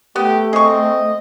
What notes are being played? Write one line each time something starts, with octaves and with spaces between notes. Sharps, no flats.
A3 B3 G4
C4 G#4 D#5 C#6